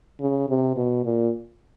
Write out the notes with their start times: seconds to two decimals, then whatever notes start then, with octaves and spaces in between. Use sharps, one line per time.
0.20 C#3
0.49 C3
0.76 B2
1.05 A#2